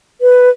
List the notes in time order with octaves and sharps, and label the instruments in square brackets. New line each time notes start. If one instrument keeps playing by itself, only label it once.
[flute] B4